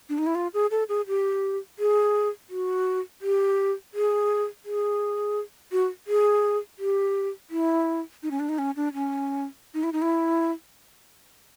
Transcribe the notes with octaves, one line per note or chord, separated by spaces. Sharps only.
D4
D#4
E4
F4
G#4
A4
G#4
G4
G#4
F#4
G4
G#4
G#4
F#4
G#4
G4
E4
D#4
C#4
D4
D#4
C#4
D4
C#4
D#4
E4
D#4
E4